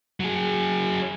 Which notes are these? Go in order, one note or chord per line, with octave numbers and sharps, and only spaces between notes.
F#3 G#4